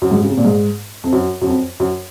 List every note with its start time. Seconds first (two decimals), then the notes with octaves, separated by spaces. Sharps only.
0.02 F#2
0.11 G#2
0.22 C#3
0.29 C3
0.37 A#2
0.45 G#2
1.04 F2
1.12 F#2
1.41 F#2
1.47 F2
1.80 F#2